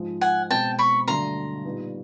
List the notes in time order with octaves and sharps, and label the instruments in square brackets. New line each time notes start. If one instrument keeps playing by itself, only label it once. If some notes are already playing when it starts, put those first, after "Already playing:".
Already playing: [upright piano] G#2 F3 G#3
[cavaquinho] F#5 G#5
[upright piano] B2 G#3 C4 [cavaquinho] G5 A5
[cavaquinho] B5 C#6
[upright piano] G2 D3 F#3 A3 D4 [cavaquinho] A#5 C6
[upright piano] A#2 G3 B3 D#4